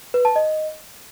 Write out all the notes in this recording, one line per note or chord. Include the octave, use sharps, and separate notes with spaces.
B4
A5
D#5